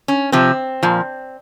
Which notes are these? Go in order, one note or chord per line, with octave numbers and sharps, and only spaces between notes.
C#4
C3 F3 C4
A#2 F3